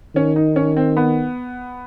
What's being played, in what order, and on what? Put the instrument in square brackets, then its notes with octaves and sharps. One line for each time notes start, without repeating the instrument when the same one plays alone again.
[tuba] D#3 [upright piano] C#4
[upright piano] D#4
C#4
C4
B3